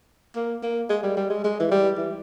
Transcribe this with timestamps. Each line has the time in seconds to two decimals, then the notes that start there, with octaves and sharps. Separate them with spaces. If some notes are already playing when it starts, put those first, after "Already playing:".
0.36 A#3
0.63 A#3
0.90 G#3
1.03 G3
1.17 G3
1.30 G#3
1.44 G#3
1.60 E3
1.71 G3
1.98 E3